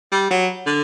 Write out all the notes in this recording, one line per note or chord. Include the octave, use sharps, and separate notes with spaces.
G3
F#3
D3